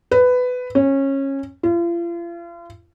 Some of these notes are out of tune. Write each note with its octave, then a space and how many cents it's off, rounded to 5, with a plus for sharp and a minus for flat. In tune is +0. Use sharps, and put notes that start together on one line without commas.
B4 +15
C#4 -20
F4 -40